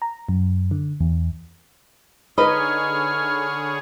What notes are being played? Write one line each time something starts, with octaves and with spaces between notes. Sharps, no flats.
A#5
F#2
D3
E2
D3 D#4 G#4 B4 C#5 D#5 B5 F6